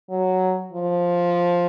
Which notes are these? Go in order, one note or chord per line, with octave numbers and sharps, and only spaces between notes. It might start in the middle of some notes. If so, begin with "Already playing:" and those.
F#3
F3